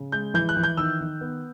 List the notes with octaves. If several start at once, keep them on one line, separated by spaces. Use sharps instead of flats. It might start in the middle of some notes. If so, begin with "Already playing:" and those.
Already playing: C#3
G#3 G6
E3 G6
F#6
E3
G6
D#3 E6
D#3
B3